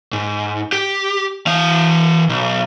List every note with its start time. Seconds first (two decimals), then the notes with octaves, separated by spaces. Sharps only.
0.13 G#2
0.72 G4
1.47 E3 F5
2.29 B1